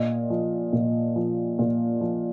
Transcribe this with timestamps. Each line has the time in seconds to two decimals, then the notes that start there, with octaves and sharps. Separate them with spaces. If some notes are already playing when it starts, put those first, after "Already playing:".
Already playing: A#2 D#5
0.30 F3
0.73 A#2
1.16 F3
1.59 A#2
2.01 F3